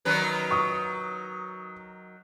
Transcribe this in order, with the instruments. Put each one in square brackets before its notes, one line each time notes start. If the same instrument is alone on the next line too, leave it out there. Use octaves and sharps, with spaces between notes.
[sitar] D#3 F#3 B4
[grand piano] C#6 D#6